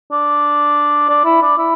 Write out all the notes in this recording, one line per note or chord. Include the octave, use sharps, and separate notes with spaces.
D4
D4
E4
D4
E4